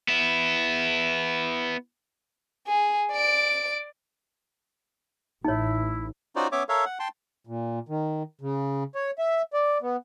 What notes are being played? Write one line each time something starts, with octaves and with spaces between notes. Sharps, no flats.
B3 E4
G#4
D5 D7
A1 D#4 E4 C#5
C#4 D#4 F4 F#4 C5 D5
B3 C#4 C#5 E5 D6
A4 A#4 C#5 E5 F5
F#5
G5 A5 C6
A#2
D#3
C#3
C#5
E5
D5
B3